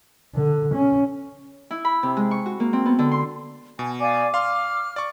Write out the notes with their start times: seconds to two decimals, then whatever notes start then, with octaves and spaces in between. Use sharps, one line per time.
0.35 D3
0.75 C#4
1.71 E4
1.85 B5
2.03 C3
2.17 G#3
2.31 C#6
2.46 F#4
2.60 A#3
2.73 C4
2.86 B3
2.99 D3
3.11 C6
3.79 B2 G#5
4.00 D5 F5 G#5 D6
4.34 F5 C6 F6
4.96 D5 C#6